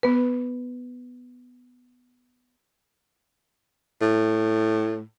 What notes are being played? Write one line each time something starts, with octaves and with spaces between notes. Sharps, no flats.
B3 B4
A2